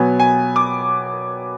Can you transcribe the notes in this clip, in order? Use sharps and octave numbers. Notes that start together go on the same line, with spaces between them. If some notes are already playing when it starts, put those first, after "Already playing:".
Already playing: B2 F#3 B3 G#5
G#5
D6